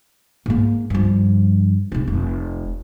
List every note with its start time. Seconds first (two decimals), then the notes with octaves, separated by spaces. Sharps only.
0.46 G#2 A#3
0.90 G2 F3
1.92 C3 D#4
2.08 F1